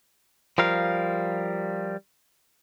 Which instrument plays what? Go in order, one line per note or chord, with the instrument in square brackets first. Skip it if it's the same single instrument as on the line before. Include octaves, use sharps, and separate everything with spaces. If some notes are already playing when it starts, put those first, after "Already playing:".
[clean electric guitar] F3 G3 A#4 F5